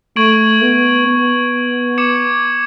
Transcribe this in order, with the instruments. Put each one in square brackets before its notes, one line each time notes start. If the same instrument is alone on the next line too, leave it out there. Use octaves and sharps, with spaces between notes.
[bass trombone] A3 [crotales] C#6 G#6 D7 F#7
[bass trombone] B3
B3
[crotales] D6 G#6 C#7 E7